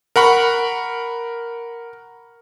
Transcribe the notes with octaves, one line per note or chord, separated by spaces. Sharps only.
A#4 F#5 B5 C#6